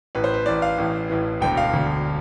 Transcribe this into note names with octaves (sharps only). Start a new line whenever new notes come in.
A1 A2 E3 B4
C5
B4
A1 A2 E3 D5
F5
A1 A2 E3
A1 A2 E3
E1 D2 D3 G5
F5
E1 D2 D3